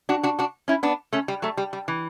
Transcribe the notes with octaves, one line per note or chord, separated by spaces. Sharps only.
D4 F#4
D4 F#4
D4 F#4
C#4 E4
B3 D4
A3 C#4
G3
F#3 A3
G3
G3
E3